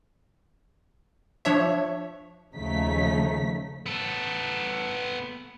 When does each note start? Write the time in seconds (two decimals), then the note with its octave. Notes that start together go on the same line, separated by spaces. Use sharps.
1.45 F3 D4 C#5 E5
2.55 D#2 C#3 F3 A3 D#4 B6
3.86 B3 A4